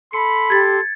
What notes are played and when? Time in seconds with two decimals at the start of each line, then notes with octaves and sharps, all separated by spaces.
0.13 A4 B5 C6 C#7
0.50 G4 G#6 A6